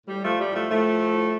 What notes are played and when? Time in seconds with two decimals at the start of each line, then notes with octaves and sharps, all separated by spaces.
0.07 A2 G3
0.23 A2 F3 A3
0.39 G3
0.49 A2 F3 A3
0.70 A2 F3 A3
0.91 A2
1.11 A2